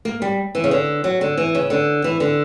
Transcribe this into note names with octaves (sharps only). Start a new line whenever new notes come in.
A#3
G3
E3
C#3
D3
F#3
D3
E3
C#3
D3
E3
D3